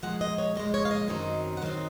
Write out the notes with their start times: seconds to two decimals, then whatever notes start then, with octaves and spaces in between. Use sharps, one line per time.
0.03 A#2 F3 G#3 F#5
0.21 D#5
0.38 C#5
0.55 A#2 F3 G#3 D#5
0.74 C#5
0.85 F5
0.91 D#5
1.08 F#2 D#3 F#3 C4 D#4
1.57 F#5
1.62 F#2 D#3 F#3 C4 D#4 F5